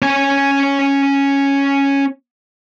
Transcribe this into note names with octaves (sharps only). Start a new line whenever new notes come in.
C#4 G#5